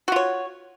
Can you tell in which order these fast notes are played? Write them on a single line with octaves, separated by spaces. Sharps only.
F#4 F4 C#5